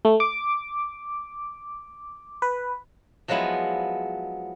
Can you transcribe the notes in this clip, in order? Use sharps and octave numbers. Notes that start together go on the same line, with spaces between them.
A3
D6
B4
F3 F#3 G#3 B3 E4